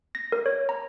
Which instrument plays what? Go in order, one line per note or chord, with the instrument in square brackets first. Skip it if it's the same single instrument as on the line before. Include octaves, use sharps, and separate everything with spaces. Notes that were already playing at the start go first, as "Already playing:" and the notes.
[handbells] A#6
A#4
C#5
A#5